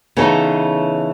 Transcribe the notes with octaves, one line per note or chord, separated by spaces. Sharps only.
C#3 E3 B3 C#4 D#4 A4